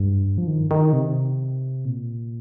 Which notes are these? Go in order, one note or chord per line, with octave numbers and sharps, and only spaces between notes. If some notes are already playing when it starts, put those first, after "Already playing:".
Already playing: G2
F3
D#3
D#3
C3
A#2